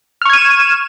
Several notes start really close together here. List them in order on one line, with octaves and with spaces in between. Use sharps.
F6 C#6 G#6 D#7 E7